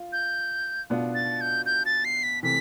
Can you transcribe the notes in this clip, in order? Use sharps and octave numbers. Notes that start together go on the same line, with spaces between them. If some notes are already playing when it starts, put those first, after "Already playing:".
Already playing: F4
G6
B2 B3 D4 F4
A6
G6
G6
A6
C7
B6
C3 E3 A3 B6